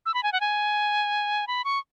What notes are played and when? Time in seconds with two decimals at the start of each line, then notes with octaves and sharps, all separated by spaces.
0.06 E6
0.14 B5
0.23 G#5
0.32 F#5
0.40 G#5
1.47 B5
1.64 C#6